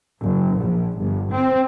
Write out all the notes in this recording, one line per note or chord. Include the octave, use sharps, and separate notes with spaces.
F#1
A#1
G1
C4